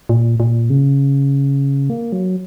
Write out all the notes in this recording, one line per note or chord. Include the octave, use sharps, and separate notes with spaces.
A#2
A#2
C#3
A#3
F#3